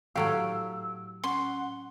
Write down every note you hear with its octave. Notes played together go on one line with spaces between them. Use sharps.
A2 F#3 G4 A4 F5 E6
C#4 F#5 C6